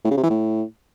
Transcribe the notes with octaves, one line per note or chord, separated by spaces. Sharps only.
A2
C#3
C3
E3
A2